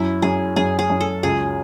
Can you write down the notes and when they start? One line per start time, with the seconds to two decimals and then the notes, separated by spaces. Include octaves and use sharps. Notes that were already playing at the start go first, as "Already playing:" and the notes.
Already playing: F#2 E4
0.22 F#2 G#4
0.56 F#2 G#4
0.79 G#4
0.90 F#2
1.00 A4
1.23 C#2 G#4